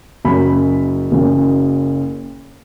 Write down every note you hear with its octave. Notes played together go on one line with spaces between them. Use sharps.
F#1 F#2 C#3 B5
F#1 F#2 C#3